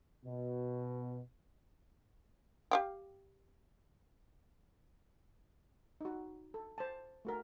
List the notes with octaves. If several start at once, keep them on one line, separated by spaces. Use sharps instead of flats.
B2
G4 F5 G5
D#4 F#4
A4
C5 A5
A3 F#4 A#4